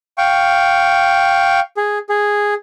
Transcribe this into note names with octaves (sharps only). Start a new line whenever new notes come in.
F5 G5 C#6
G#4
G#4